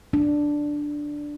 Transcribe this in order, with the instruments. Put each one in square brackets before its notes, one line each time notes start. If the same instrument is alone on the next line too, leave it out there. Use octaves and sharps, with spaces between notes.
[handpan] D4